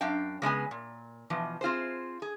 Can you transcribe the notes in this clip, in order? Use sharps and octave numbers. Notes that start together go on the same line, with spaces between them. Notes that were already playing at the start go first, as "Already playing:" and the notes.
F#2 D4 F5 G5
C#3 G#3 B3 G#5
A#2
B2 E3 F3
C4 F4 G#4 C5
G#4